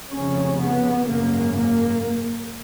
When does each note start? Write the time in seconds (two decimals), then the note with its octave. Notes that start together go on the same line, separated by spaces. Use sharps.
0.12 F1 F2 C#3 C#4
0.59 B3
1.05 G#1 F#2 C#3 A#3
1.53 A#3